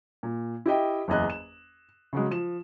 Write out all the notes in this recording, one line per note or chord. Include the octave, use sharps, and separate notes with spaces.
A#2
E4 G4 D#5 G5
F#1 E2 D#5 F#6
E7
C#3 F#3 G#3
F3 E7